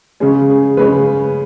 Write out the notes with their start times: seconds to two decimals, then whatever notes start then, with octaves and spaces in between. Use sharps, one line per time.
0.20 C#3 G#3 C#4 G#4
0.50 G#4
0.77 C#3 G#3 C#4 B4